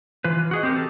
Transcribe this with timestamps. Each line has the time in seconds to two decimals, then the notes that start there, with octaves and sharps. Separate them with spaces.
0.24 E3 F4 B4
0.51 F#4 G#4 D#5
0.63 C4 G4 A#4
0.76 A4